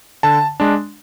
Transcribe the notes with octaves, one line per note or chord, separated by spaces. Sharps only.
D3 A5
G#3 D4